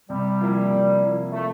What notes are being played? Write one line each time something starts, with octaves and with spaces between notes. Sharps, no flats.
C3 G3
F3 A#3 E4
C3
F3 A#3 E4
A3